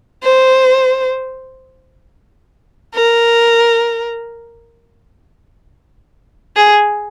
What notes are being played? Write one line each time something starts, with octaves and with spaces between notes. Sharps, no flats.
C5
A#4
G#4